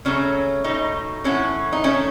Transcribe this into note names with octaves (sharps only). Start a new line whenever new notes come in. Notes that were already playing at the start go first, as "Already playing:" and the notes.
C#3 F#3 A3 C#4
B2 A3 D#4
A2 E3 B3 C#4
D#4
D#3 A3 C#4